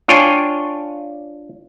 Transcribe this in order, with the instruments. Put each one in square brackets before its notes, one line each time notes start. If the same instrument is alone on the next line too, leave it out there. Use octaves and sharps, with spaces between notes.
[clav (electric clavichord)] D4 F4 C#5 G5 G#5